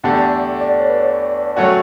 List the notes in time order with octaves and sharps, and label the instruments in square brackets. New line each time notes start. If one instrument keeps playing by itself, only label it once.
[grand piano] E2 D3 A3 D4 G4 [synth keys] F#5
[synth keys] G5
D5
C#5
B4
C#5
[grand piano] F#3 A3 C#4 F#4 [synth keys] G5